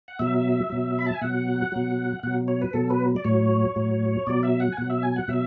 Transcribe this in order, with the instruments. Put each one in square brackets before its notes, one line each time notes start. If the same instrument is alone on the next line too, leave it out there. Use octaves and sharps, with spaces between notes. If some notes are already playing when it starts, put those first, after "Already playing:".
[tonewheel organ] F#5
B2 F#3 E5
B2 F#3
B5
A5
G#5
B2 F#3 F#5
B2 F#3
B2 F#3 F#5
C#5
B4
B2 F#3 A4
B4
D5
A2 F#3 C#5
A2 F#3
B2 F#3 D5
E5
F#5
G#5
B2 F#3 F#5
E5
G#5
F#5
B2 F#3 E5